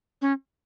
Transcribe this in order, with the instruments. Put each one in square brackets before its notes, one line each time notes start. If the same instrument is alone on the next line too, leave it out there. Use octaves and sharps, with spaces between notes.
[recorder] C#4